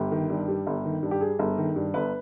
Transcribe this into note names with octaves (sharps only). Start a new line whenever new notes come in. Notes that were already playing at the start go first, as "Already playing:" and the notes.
Already playing: G1 G4
D#3
G2
G3
G1
D#3
G2
G4
G3 G#4
G1
D#3
G2
G1 B4